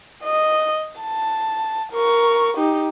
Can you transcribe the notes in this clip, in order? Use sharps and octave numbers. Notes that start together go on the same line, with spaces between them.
D#5
A5
A#4 C#6
D#4 G4